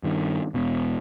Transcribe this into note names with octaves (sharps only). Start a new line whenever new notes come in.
G2 D#3
E1 B2